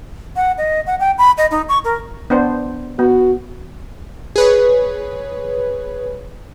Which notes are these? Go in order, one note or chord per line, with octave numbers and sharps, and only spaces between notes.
F#5
D#5
F#5
G5
B5
D#5
D#4
C#6
A#4
B3 D4 C5
B3 F#4
G#4 B4 C#5